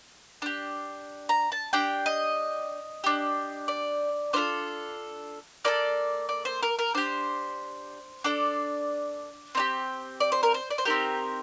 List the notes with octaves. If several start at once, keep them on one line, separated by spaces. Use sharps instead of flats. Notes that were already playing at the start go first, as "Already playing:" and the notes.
D4 G4
A#5
A5
D4 G4 G5
D#5
D4 G4
D5
D4 F4 A4 C5
A#3 F4 A4 D5
D5
C5
A#4
A#4
D4 G4 C5
D4 A4 D5
C4 D#4 G4
D5
C5
A#4
C5
D5
C5
C4 D#4 G4 A#4